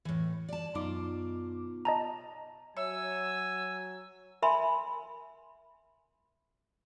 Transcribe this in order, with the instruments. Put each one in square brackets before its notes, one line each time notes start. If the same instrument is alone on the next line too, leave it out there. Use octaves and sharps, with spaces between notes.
[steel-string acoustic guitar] A2 E3
D5 A5
[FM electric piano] F#2 D#4 D6 [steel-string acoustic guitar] B2 F4
[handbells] D#5 A5 A#5
[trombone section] F#3 [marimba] C#5 E5 [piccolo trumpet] G#5 [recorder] E6
[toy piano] A#4 E5 G#5 B5 C6